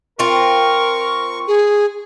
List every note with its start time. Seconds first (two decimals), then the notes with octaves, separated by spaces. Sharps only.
0.19 C4 F4 A#4 C#6
1.48 G#4